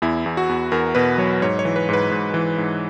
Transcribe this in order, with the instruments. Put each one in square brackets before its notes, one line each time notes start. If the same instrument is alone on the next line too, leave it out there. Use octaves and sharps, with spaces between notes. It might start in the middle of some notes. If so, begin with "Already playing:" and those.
[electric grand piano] E2 E4
E2
F#4
E2
E2 A#4
B2 B4
F#3 C#5
G#2 C#5
C#5
E3
B4
G#2 B4
G#2
E3
G#2